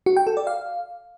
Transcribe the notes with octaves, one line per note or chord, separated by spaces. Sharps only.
F#4
G5
A4
D5
F5